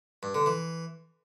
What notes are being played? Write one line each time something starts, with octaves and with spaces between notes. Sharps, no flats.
G2
D3
E3